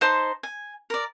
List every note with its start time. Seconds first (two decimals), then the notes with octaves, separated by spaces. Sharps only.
0.01 D#4 C5 A5 C6
0.43 G#5
0.90 A#4 D5